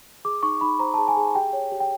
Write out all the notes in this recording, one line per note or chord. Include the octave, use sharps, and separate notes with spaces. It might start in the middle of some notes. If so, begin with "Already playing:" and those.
G#4 D6
D#4 C#6
D#4 B5
C5 A#5
G#4 A5
G#5
G#4
G4 G5
C#5
G4
G5